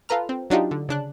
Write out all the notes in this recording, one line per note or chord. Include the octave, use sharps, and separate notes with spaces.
F4 A4 B4 A#5 F6
C4
F#3 D4 D#4 F4 G4
D3
C#3 D4 F#6